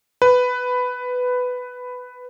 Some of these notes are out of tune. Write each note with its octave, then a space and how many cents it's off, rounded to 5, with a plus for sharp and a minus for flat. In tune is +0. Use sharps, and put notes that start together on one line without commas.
B4 +10